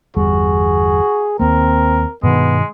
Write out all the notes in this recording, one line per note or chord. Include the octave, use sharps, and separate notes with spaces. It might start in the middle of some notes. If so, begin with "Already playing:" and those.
G1 E2 G3 F#4 G#4
D#2 A#3 C4 A#4
G2 B2 D#3 G#3 B3